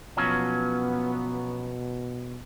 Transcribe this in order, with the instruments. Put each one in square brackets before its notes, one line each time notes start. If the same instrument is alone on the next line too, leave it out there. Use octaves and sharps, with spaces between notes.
[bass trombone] B2 [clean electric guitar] F3 F#3 C#4 [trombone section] B3